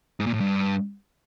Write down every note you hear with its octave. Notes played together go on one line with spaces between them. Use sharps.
G#2
A#2
A2
G2